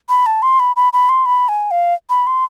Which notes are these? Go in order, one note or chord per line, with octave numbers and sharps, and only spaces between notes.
B5
A5
C6
B5
B5
B5
C6
B5
G#5
F5
B5
C6